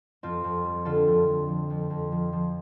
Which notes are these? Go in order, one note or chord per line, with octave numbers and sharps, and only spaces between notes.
F2 C4 F4
F2
G3
D3 F4 A4
F2
F2
F3
F2
F2
F3
F3